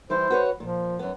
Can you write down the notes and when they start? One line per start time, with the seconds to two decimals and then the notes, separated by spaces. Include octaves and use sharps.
0.10 E3 G3 E4 C5
0.30 F#4 B4 C#5
0.60 A#2 F3
0.99 F#2 B3